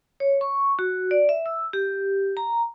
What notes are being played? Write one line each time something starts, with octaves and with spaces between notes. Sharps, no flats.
C#5
C#6
F#4
D5
E5
E6
G4
A#5